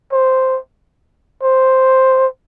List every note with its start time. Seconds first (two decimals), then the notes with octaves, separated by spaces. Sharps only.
0.12 C5
1.43 C5